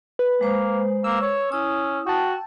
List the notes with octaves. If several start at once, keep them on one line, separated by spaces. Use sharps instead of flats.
B4
G#3 A#3 C5
A#3 E6
C#5
C#4 E4 D#6
F#4 G5 A5